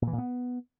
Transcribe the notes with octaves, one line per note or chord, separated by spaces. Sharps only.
A#2
E3
A#2
B3